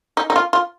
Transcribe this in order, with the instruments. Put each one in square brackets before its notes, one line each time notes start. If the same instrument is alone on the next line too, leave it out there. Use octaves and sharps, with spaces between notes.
[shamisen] D#4
D#4
F4
F4